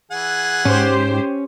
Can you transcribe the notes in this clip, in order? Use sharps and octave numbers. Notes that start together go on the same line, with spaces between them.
E3 G#4 F#5
G#2 C#4 G4 C5